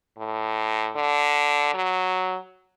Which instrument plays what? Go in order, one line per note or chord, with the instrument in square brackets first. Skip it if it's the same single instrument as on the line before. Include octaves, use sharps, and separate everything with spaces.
[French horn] A2
D3
F#3